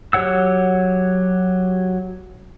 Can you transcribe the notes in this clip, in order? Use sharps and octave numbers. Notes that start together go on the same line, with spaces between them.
F#3 G4 C#5 F#5 E6